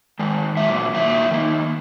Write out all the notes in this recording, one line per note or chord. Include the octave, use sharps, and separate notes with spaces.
D#3 G#3
A#2 F#3 A#3 E5
A#2 F#3 A#3 E5
D#3 A#3